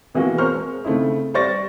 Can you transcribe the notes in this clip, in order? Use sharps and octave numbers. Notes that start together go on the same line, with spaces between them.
B2 E3 G#3 A#3 F#4
A#4 C5 A#5 C#6 F6
G#3
C#3 A3 C4 D#4 E4
G3 C5 D5 C#6 A6 A#6